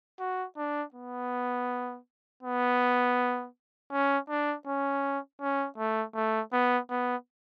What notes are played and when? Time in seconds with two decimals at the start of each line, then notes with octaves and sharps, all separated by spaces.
0.20 F#4
0.57 D4
0.94 B3
2.43 B3
3.92 C#4
4.30 D4
4.67 C#4
5.41 C#4
5.78 A3
6.15 A3
6.53 B3
6.90 B3